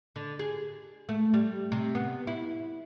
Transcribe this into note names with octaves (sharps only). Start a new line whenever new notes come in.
D3
G#4
A3
G3
C3
B3
E4